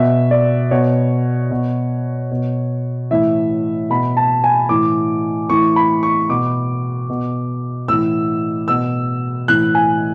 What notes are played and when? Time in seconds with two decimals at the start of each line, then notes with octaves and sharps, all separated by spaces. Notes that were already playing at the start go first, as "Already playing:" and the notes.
Already playing: B2 E5
0.31 D5
0.71 B2 C#5
1.51 B2
2.31 B2
3.11 A2 E3 E5
3.90 B2 B5
4.17 A5
4.44 G#5
4.69 A2 E3 D6
5.49 A2 E3 C#6
5.76 B5
6.03 C#6
6.30 B2 D6
7.10 B2
7.88 A2 E3 E6
8.68 B2 E6
9.48 A2 E3 F#6
9.75 G#5